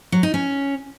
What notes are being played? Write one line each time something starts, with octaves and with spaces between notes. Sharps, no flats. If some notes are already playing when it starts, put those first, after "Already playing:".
F#3
D#4
C#4